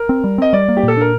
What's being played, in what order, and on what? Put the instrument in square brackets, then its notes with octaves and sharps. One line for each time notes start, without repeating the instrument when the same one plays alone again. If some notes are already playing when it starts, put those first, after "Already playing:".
Already playing: [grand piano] A#4
[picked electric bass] C4
G3
[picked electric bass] C4 [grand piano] D#5
[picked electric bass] G3 [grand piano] D5
[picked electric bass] A#3
[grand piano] G4
[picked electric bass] A#2 [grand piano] A4
[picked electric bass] D4 [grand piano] A#4